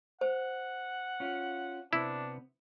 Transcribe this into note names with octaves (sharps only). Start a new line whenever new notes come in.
C5 F#5
C#4 F4
C3 B3 D4 E4